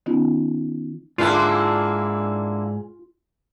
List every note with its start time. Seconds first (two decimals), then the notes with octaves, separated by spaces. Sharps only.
0.06 D#3 B3 C#4 D#4 F4
1.18 G#2 D3 A#3 E4 F4 G#4